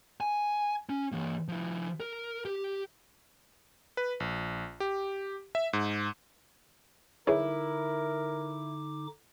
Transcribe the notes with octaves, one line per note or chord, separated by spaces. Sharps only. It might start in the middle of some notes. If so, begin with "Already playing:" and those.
G#5
C#4
E3 A#3
F3 E4
A#4
G4
B4
A#1
G4
E5
G#2
D3 D#4 E4 G#4 A#4 B4 C#5 D6